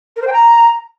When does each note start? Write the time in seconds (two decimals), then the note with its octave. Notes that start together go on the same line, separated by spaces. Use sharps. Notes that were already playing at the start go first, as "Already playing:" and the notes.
0.16 A#4
0.22 C5
0.27 G5
0.33 A#5